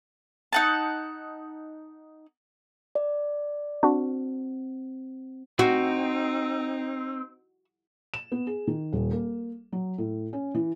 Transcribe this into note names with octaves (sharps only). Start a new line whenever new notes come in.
D#4 F#5 A5
D5
C4 D4 F#4
C4 D#4 F#4
E7
B3
G#4
D#3
D#1
A#3
F#3
A2
C#4
E3